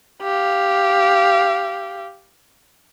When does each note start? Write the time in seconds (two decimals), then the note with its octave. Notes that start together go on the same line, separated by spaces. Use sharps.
0.22 G4 F5